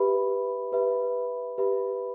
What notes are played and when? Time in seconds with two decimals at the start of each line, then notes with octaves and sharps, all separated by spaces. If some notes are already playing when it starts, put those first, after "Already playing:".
Already playing: G4 B4 E5 B5
0.72 G4 B4 E5 B5
1.58 G4 B4 E5 B5